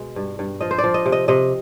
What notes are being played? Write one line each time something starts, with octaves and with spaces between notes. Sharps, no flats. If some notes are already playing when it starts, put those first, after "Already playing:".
Already playing: B2 G#3
G2
G2
F3 D#5
C5
D5
F3
D#5
C3
D#5
C3 D#5